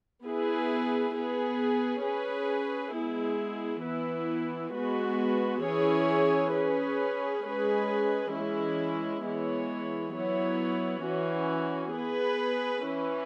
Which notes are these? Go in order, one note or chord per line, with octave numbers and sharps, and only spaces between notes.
B3 E4 G#4 B4
B3 G#4 B4
C#4 G#4 B4
G#3 B3 E4 G#4
E3 B3 E4 B4
G#3 B3 F#4 B4
E3 C#4 E4 G#4 C#5
C#4 G#4 B4
G#3 C#4 G#4 B4
E3 G#3 C#4 E4
E3 G#3 B3 E4 C#5
F#3 B3 E4 C#5
E3 C#4 F#4
B3 G#4 B4
E3 C#4 E4 B4